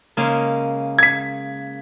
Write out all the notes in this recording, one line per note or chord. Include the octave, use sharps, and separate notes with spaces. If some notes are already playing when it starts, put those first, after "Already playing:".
C#3 G#3 A#3
G#6 B6